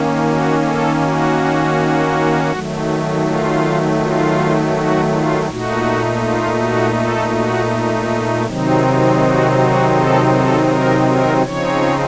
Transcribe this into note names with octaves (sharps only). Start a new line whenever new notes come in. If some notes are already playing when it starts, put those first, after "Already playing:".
Already playing: D#3 A#3 C#4
F#4
A4
F#4
D#3 F#3 A3
F4
F4
F#4
F4
A#2 A3 D#4 F#4
F4
F#4
A4
F#4
C3 D#3 F#3 C4 D#4
F#4
F#4
A4
A4
A#4
A#4
C#3 F3 C4 D#4 C#5